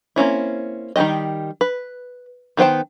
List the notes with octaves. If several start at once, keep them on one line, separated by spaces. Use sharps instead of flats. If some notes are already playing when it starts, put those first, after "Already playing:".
A#3 C4 C#4 E4
D#3 G3 C4 G4 D#5
B4
D#3 B3 C5 G5 A5